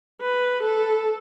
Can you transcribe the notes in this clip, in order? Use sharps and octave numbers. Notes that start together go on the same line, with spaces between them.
B4
A4